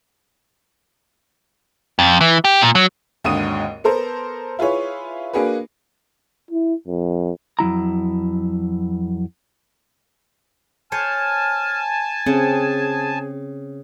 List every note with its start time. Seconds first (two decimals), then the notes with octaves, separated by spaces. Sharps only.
1.99 F2
2.21 E3
2.45 G4
2.61 A#2
2.75 F#3
3.24 G#1 D#2 G#2 D3 D#6 D#7
3.84 B3 A4 A#4 C5
4.59 E4 F4 G#4 B4 C#5
5.34 A#3 D4 F#4 G#4 B4
6.51 E4
6.87 F2
7.59 F2 F#3 E4 A#5
10.92 C5 C#5 G#5 A5 F6
12.26 C#3 C4 G#4